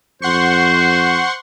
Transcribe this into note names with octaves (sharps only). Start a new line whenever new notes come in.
F2 C5 F#5 C6 C#6